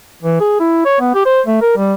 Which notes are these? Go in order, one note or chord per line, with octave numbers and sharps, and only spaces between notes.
E3
G#4
E4
C#5
B3
G4
C5
A3
A#4
G3